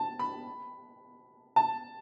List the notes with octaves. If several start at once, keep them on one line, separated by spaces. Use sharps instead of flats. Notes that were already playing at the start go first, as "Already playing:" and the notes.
Already playing: A5
B5
A5